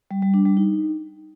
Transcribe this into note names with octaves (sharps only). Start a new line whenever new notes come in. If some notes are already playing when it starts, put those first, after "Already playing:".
G3
G3
D4
G3
D#4